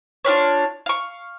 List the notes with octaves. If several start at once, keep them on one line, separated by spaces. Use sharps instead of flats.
D4 F4 B4 C#5
F5 C#6